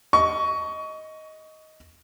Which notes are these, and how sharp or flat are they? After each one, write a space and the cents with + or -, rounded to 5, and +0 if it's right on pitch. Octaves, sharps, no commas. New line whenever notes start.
D#5 +10 C#6 +20